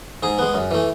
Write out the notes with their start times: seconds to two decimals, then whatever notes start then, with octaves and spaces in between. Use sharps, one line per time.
0.23 G#2 G#4
0.38 G#3 B3
0.54 F#2
0.71 E3 A3